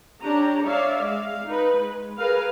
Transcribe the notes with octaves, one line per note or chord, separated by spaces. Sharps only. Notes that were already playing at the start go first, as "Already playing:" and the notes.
C#4 D4 G4 A#5
C#5 D5 E5 F5
G#3 F5
D#4 B4
G#3
G#4 A#4 B4 F5